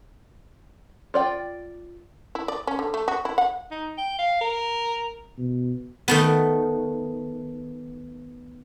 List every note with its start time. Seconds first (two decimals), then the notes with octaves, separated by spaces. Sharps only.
1.14 F4 D5 G5
2.35 E4
2.48 D5
2.67 C#4
2.79 D3
2.94 A3
3.08 F#4
3.25 E4
3.38 F#5
3.71 D#4
3.98 G5
4.19 F5
4.41 A#4
5.38 B2
6.08 D#3 A3 B3